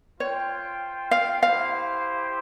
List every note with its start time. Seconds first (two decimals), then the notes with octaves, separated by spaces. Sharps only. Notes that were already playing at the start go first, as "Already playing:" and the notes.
0.20 F4 C5 C#5 G5
1.11 F5
1.42 E4 G4 C5 F5